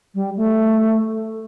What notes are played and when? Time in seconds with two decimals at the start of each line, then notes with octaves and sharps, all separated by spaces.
0.15 G3
0.37 A3